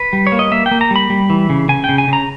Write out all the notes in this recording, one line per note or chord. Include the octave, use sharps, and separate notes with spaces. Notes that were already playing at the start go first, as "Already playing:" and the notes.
Already playing: B4
G3
C#5
A#3
D#5
A#3 E5
G5
A#3
A#5
G3 B5
G3
E3
C#3
C#3 G#5
G5
C#3
G#5
C#3 A#5